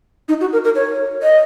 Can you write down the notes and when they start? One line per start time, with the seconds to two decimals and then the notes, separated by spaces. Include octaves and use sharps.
0.28 D#4
0.41 F#4
0.53 A#4
0.64 A#4
0.75 C#5
1.23 D#5